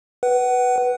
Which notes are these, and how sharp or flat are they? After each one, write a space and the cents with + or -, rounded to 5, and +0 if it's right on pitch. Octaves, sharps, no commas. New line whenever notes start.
B4 -5 F#5 +25